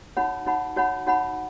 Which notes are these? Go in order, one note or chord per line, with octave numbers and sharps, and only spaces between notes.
D#4 F#4 C#5 F#5 B5
D#4 F#4 C#5 F#5 B5
D#4 F#4 C#5 F#5 B5
D#4 F#4 C#5 F#5 B5